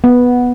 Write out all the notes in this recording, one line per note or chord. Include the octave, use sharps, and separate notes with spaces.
B3